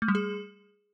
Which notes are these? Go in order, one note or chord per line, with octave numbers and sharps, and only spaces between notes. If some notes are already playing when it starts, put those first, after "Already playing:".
A3
G3
G#4